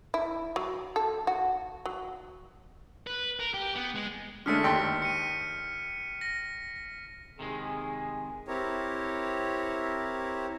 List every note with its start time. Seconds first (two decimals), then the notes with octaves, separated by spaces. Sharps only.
0.14 E4
0.56 F#3
0.96 A4
1.27 F#4
1.85 F#3
3.07 B4
3.40 A#4
3.54 G4
3.75 B3
3.95 G#3
4.46 D3 G#3 A3 F6 B6 C#7
4.64 D#2 G5 C6
5.02 C#7 D#7
6.21 A#6
7.39 C3 D#3 G#3 G#4
8.47 C4 E4 G4 A#4 C#5